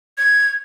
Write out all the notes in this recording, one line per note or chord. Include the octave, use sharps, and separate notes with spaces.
G#6